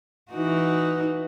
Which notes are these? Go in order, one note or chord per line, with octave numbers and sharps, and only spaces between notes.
E3 D#4 F#4